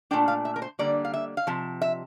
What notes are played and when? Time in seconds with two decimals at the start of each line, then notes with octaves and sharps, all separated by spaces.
0.11 A#2 A3 D4 G5
0.28 F5
0.45 E5
0.56 A#4
0.62 C5
0.79 D3 G3 A#3 D5
1.05 F5
1.14 E5
1.37 F5
1.47 C3 F3
1.82 E5